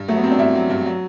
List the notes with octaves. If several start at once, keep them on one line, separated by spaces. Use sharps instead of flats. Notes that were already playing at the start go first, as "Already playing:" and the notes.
Already playing: G2
F#3 A3
B3
F#3 C4
D4
G2 E4
F#3
G2
F#3